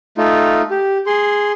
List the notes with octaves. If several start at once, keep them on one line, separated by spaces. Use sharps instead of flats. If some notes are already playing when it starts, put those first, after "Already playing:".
A3 D#4 F4
G4
G#4 C6